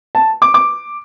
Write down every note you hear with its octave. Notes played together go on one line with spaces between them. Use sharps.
A5
D6
D6